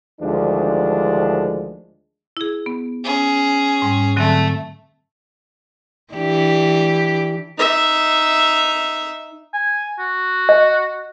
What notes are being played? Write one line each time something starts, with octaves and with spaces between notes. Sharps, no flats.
D2 D#3 F3 G3 G#3 D4
E4 G#4
B3
C#4 G#4
G#2 G3
D3 F#3 A3 C4
E3 D4 G4
D#4 E5
G#5
F#4
D#5